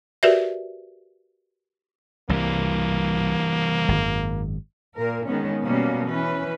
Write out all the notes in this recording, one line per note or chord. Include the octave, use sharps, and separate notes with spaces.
F#4 G4 A#4 B4 D5 E5
C2 E3 G3 A#3
G#1 F#2
A#2 A#4
D#3 G#3 B3 C#4
B2 G3 A#3 C#4
E3 C#4 B4